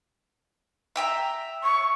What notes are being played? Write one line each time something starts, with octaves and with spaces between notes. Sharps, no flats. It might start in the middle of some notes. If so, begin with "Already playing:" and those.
E5 G5 A#5
C#6